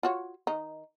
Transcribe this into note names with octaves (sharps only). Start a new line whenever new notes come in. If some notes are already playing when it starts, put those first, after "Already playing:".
F4 F#4 C#5
D#3 D#4